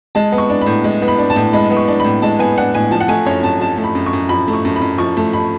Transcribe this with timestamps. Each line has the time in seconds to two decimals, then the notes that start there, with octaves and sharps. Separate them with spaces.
0.15 G#3 A5
0.32 B3
0.38 C#6
0.50 D4
0.61 B5
0.66 A2
0.84 G#3
1.02 B3
1.08 B5
1.18 D4
1.30 A5
1.36 A2
1.53 G#3 B5
1.70 B3
1.77 C#6
1.88 D4
2.00 A2 B5
2.22 G#3 A5
2.39 B3 G#5
2.57 D4 F#5
2.74 A2 G#5
2.91 F3 A5
3.00 F#5
3.08 A3 G#5
3.26 F#2 C#5
3.43 F#2 A5
3.61 F3 A5
3.78 A3
3.84 B5
3.95 F#2
4.06 C#6
4.13 F#2
4.29 F3 B5
4.48 A3
4.53 C#6
4.65 F#2
4.76 B5
4.81 F#2
4.98 F3 C#6
5.17 A3
5.33 B5